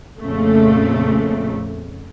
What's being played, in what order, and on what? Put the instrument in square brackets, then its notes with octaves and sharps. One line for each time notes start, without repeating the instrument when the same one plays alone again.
[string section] F2 A#2 C#3 A3